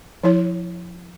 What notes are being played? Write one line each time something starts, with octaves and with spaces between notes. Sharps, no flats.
F3 E4 C#5